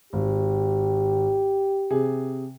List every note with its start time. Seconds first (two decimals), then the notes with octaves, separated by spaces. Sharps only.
0.13 G#1 G4
1.90 C3 G#4